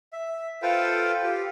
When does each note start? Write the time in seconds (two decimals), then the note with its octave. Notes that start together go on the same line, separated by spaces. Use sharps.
0.13 E5
0.62 F4 A4 B4 C5 F5 G5
1.23 F4 G4